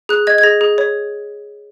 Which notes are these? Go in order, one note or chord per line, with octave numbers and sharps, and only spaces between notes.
G#4 F#6
D#5 G#6
G#6
G#4 A#6
G#4
C#5